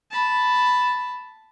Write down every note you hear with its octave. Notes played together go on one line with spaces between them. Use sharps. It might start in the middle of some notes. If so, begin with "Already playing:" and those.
A5 B5